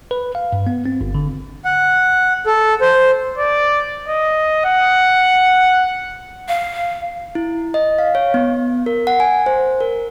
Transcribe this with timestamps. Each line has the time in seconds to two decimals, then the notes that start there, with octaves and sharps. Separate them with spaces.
0.11 B4
0.35 F5
0.53 G2
0.67 B3
0.86 C4
1.01 G1
1.15 D3
1.65 F#5
2.46 A4
2.81 C5
3.38 D5
4.08 D#5
4.65 F#5
6.48 F5
7.35 E4
7.74 D#5
7.98 F5
8.15 C#5
8.34 B3
8.86 A#4
9.07 F#5
9.20 G#5
9.46 C5
9.80 A#4